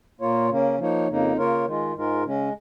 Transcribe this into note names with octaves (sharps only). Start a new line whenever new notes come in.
A#2 A#3 F4 C#5
C#3 A#3 C#4
F3 A#3 D#4 C#5
F2 C#3 A#3 D#4
C#3 A#3 F4 A#4 C#5
D#3 G#3 F4
G#2 G#3 F4 A#4
C#3 G#3 C#4